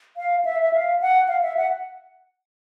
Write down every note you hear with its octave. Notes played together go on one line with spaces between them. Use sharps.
F5
E5
E5
F5
F#5
F5
E5
F#5